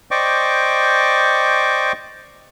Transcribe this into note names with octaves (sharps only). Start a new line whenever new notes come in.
C5 D5 D#5 G5 C#6 D6